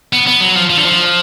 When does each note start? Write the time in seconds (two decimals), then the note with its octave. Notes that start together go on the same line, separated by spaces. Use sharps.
0.13 B3
0.27 B3
0.41 F#3
0.55 F3
0.70 F3
0.77 D3
0.85 F3